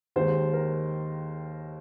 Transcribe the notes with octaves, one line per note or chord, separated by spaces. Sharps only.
D#2 D#3 G#3 C5
A#4